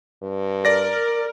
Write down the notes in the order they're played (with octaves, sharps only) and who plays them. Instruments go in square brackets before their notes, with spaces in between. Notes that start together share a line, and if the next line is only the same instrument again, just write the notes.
[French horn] G2
[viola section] A#4 [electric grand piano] D5 A#6